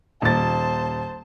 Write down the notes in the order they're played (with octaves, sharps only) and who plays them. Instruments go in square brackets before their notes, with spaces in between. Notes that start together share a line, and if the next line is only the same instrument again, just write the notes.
[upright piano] D#1 A6 [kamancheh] C5 A5